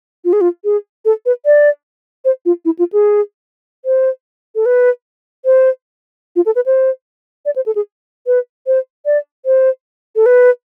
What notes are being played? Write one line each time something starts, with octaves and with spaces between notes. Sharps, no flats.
F4
G#4
F4
G#4
A4
B4
D5
C5
F4
E4
F4
G#4
C5
A4
B4
C5
F4
A4
B4
C5
D5
C5
A4
G#4
B4
C5
D5
C5
A4
B4